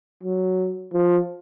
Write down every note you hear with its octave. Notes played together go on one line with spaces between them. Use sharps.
F#3
F3